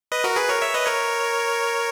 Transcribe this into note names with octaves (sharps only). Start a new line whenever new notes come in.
B4 D#5
F#4 A#4
G#4 B4
A#4 C#5
C#5 E5
B4 D#5
A#4 C#5